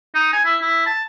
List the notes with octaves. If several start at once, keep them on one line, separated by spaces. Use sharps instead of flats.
D#4
G#5
E4
E4
A5